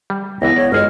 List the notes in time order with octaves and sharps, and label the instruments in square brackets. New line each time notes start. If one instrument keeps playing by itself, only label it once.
[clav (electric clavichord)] G3
[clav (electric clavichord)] C#2 E3 [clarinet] B3 [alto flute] E4 [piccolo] A#6
[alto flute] C#5 [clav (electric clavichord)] D5
[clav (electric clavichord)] G1 G#4 C#5 [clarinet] G#3 [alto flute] D#5 [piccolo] F6